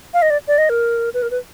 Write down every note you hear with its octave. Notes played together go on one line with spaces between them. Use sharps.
F5
D#5
D5
D5
D#5
A#4
B4
A#4
B4